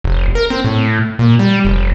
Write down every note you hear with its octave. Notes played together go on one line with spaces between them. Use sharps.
F1
A#4
C4
A2
A#2
G3
F1